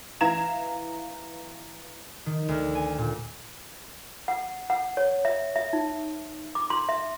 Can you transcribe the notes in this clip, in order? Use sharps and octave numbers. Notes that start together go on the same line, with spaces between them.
E3 F5 A#5 G#6 E7
D#3
D2
G#5
A#2
F#5
F#5
C#5
E5
E5
D#4
D6
C6
E5